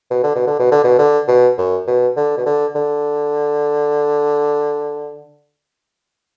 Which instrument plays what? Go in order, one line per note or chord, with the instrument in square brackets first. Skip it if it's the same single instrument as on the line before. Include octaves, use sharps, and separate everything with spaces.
[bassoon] B2
D3
B2
D3
B2
D3
B2
D3
B2
F#2
B2
D3
B2
D3
D3